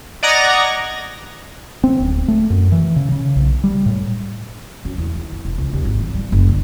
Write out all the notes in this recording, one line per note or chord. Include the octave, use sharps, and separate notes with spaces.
D5 D#5 F#5 A#5 G#6 A#6
C4
D1
A3
F#2
E3
C#3
C#3
B1
G3
A2
F#2
E2
D#3
F2
E1
C#2
D#2
G#1
E3
G3
F#1
D3